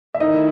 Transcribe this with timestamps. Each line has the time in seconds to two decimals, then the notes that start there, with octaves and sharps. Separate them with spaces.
0.14 E5
0.20 D#3 A3 D#4 E4 D#5